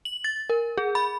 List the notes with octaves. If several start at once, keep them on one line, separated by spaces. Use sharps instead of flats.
F#7
A6
A#4
G#4
B5